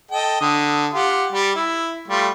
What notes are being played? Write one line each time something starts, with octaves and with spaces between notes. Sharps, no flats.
A4 D#5 G5
D3 D#6
F4 G4 F#5
G3 G4
E4
G3 A3 F4